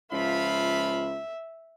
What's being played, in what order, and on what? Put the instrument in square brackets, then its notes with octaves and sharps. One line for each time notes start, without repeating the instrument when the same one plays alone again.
[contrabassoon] C#2 [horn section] F3 F5 B5 [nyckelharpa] E5